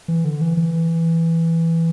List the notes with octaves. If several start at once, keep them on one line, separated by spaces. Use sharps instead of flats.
E3
D3
E3
E3